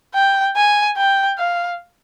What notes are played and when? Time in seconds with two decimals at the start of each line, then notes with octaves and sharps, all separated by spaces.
0.15 G5
0.56 G#5
0.97 G5
1.39 F5